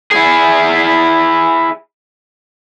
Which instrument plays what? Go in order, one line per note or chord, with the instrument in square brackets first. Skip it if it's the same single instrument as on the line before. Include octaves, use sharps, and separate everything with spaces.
[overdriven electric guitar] E4 G#4